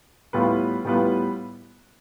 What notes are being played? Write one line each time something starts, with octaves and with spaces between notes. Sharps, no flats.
A2 G3 B3 F4 B4
A2 G3 B3 F4 B4